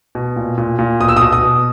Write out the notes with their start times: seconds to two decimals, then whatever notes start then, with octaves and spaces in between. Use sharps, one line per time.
0.15 B2
0.36 A#2
0.58 A#2
0.79 A#2
1.00 B2 D#6
1.08 E6
1.17 B2 D#6
1.32 D#6
1.43 B2